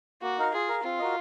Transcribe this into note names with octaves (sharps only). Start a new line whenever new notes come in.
A#3 F#4
D#4 A#4 F5
F4 G#4
A#4 F5
C4 F4
F#4 A#4 D#5